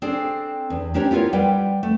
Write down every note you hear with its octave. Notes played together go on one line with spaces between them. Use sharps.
C4 D4 G#4 A4 D5
E2
C#4 D4 G4 A#4 C5 C#5
B3 E4 F4 A4 A#4 C#5
G3 B4 F#5 G5
A3